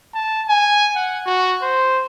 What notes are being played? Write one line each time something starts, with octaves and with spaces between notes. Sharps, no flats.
A5
G#5
F#5
F#4
C5